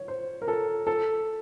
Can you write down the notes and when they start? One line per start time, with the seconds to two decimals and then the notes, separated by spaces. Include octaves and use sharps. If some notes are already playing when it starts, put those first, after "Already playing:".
Already playing: C#5
0.08 C5
0.42 A#4
0.48 A4
0.87 A4